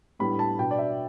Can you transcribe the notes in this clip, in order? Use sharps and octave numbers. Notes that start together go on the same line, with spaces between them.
A2 G3 B3 D4 B5
A5
B2 B3 D4 G5
D5
E5